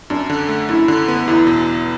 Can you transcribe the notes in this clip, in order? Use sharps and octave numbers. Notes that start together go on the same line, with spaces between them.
F#2 D4
D3
A3
F#2 E4
D3
B3
E2 E4
B2